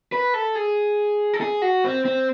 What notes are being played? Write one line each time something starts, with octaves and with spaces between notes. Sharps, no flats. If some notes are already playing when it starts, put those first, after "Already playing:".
B4
A4
G#4
A4
G#4
F#4
C4
C4